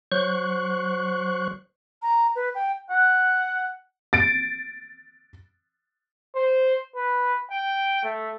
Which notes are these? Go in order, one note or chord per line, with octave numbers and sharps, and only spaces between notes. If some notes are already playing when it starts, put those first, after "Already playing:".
F#3 C5 C#6 F#6
A#5
B4
G5
F#5
A6 D7
C5
B4
G5
A3